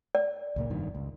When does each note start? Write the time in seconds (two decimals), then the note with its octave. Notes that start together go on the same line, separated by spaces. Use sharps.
0.15 D5
0.56 C#2 A#2 A#3
0.70 F1 G2 D#3
0.95 C#2